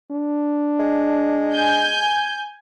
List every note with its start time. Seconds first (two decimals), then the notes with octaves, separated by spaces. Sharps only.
0.11 D4
0.79 G#3
1.54 G#5 G6